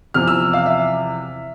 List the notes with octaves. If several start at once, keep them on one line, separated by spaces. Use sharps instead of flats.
E2 C3 F3 F6
E6
F5
E5